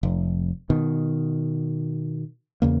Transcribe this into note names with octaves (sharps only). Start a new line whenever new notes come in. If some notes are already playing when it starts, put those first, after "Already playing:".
F1
B2 D#3
E2 C#3 A#3